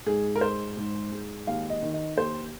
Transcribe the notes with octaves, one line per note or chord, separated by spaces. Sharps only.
G#2 G#4
A#4
G#3 C5
G#2
G#3
D#2 F5
D#5
D#3
D#5
D#2 C5